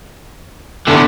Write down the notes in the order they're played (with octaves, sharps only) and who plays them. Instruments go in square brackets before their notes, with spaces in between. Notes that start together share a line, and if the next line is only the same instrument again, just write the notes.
[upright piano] E2 A3 [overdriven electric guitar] D3 B3